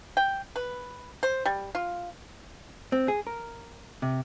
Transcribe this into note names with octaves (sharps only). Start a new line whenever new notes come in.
G5
B4
C5
G3
F4
C4
G#4
A#4
C3